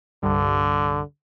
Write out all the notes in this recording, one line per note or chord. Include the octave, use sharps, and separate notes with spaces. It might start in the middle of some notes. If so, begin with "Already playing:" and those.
C2 G2 D3